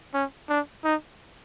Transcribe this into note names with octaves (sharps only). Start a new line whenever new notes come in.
C#4
D4
D#4